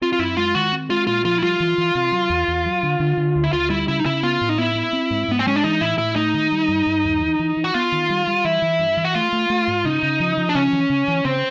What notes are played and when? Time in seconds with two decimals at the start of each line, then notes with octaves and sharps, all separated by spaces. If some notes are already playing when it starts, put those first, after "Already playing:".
0.01 C4 F4
0.13 F4
0.19 F#2 E4
0.37 G#3 F4
0.55 D#3 F#4
0.72 C4
0.90 G#3 F4
1.07 A#2 F4
1.25 F3 F4
1.38 E4
1.42 G3 F4
1.60 E3
1.78 E3
1.95 C3
2.12 F#3
2.30 E2
2.48 E2
2.66 F#3
2.83 D3
3.00 D3
3.17 D3
3.36 D2
3.44 E4
3.53 D2 F4
3.70 G3 E4
3.88 C#3 E4
4.00 D#4
4.05 C#3 E4
4.23 B3 F4
4.41 A2
4.49 D#4
4.58 B3 E4
4.75 B3
4.93 C4
5.11 G#2
5.28 G#2 B3
5.39 C4
5.47 G#3 C#4
5.56 D4
5.64 E3 D#4
5.81 A2 E4
5.98 A2 E4
6.16 A3 D#4
6.34 D#3
6.52 G3
6.68 G2
6.87 G2
7.05 D#2
7.21 E3
7.39 E3
7.57 E3
7.64 F#4
7.74 B3 F4
7.92 D#3
8.10 G3
8.27 G3
8.45 E3 E4
8.62 E3
8.79 G2
8.97 E3
9.05 F#4
9.15 A3 F4
9.33 A3
9.50 A3
9.68 G#2
9.85 C#3 D#4
10.03 C#3
10.20 F3
10.37 F3
10.49 D4
10.55 C#3 C#4
10.73 E3
10.90 C#3
11.08 E3
11.25 C#3 C4